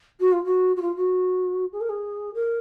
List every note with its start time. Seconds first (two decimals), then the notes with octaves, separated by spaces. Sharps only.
0.20 F#4
0.32 F4
0.44 F#4
0.76 F#4
0.81 F4
0.96 F#4
1.72 G#4
1.80 A#4
1.89 G#4
2.34 A#4